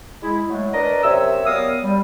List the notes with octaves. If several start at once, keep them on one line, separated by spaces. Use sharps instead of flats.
G#3 E4
F#3 G#3 A3
D4 A#4 B4 D5 D#5
F#2 C3 C#5 E5 E6
F#3 G3 B3 A#4 F5 D#6
G3